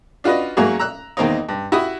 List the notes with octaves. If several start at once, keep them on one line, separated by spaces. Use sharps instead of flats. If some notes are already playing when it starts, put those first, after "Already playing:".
D4 F4 F#4 B4 D#5
G#2 F#3 A3 A#3 F#4 G#4
A#5 E6 F#6
E2 D#3 A#3 C4 D#4
G2
E4 F#4 G4 B5 D#6